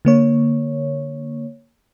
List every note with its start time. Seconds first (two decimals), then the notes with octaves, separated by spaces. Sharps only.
0.05 D3 A#3 C#5